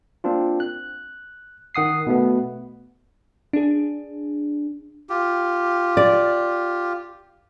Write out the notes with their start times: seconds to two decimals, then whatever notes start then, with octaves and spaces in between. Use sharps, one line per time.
0.24 A#3 C4 D4 F4
0.60 F#6
1.75 D#3 F#5 D#6 C7
2.07 B2 A3 B3
3.53 D4 G#4
5.09 F4 G4
5.97 D5